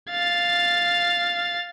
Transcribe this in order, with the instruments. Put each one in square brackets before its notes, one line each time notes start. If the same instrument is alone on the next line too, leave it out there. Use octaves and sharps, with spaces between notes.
[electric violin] F5 A6